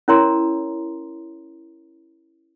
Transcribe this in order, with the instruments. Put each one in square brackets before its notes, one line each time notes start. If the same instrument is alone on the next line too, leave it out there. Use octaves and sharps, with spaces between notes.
[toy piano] C#4 E4 A#4 C#5 A#5 C6